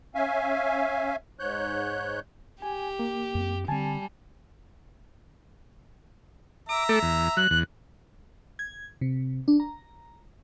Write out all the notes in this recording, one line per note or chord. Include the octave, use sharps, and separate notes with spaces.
C#4 E5 F5 G#5
G#2 C#5 F#6 G6
G4 G#5
A#3
F#2 C4
D3 G3 C4 G#5 A5
E5 A#5 D6
A3 A4 D6
E2
F#3 F#6
E2 F#6
G#6
C3
D4
A#5